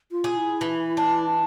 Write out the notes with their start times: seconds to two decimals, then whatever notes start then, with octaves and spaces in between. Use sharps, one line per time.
0.11 F4
0.24 G#4
0.36 E4
0.61 E3
0.97 D4